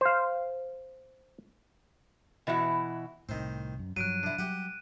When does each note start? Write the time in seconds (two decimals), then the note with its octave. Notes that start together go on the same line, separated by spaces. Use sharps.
0.01 C5 F5
2.47 B2 E3 E4 F#4
3.29 C2 A2 D#3 C4
3.79 F#2
3.97 G2 F3 F#3 F#6 D7 D#7
4.23 D3 E4
4.39 F#3 G3 G4 F#5